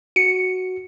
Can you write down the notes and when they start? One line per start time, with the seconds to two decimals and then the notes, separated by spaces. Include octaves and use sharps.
0.16 F#4 C#7